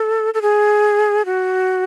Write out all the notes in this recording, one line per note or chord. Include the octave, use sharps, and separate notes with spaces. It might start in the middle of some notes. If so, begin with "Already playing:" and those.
Already playing: A4
A4
G#4
F#4